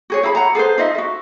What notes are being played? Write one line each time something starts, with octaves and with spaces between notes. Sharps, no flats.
F#4 G#4 C#5
E4 G#4 A#5 B5
F#5 A#5
G#4 A4 B4 C5
D#4 F4 D#5 E5
F#4 E5